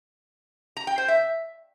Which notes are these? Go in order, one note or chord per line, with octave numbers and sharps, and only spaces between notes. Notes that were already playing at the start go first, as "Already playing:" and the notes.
A#5
G5
C5
E5